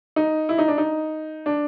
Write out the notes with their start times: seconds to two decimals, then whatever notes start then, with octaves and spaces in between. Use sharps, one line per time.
0.16 D#4
0.49 E4
0.58 D#4
0.68 D4
0.78 D#4
1.46 D4